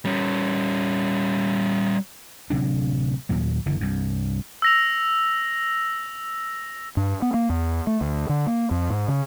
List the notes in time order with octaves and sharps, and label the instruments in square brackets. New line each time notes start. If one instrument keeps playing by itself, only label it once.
[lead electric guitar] G3 C#4
[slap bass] D1 C3 F#3 D4
D#2 A#2 F#3
F#1 D3 E3
C2 G2
[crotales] E6 A#6 F7
[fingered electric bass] G2
B3
A#3
E2
A3
D2
D3
A#3
F2
G#2
C#3